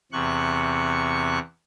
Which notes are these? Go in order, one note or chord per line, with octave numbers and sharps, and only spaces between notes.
E2 C3 C#6 F#6